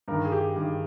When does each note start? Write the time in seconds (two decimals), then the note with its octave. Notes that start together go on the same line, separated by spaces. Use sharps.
0.08 G2 A#4
0.11 D#3
0.25 G#4
0.32 G4
0.56 G2 D#3